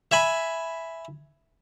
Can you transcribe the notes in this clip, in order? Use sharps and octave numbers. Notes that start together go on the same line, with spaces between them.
E5 G#5 B5